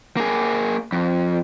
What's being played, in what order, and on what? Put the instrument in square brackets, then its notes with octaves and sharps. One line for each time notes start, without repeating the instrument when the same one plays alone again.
[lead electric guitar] A#3 G#4
F2